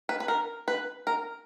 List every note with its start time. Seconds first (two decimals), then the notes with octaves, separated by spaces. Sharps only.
0.09 B4
0.20 B4
0.28 A#4
0.68 B4
1.07 A#4